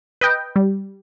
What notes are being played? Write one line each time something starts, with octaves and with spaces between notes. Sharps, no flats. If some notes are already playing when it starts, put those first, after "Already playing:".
B4 D#5 G5
G3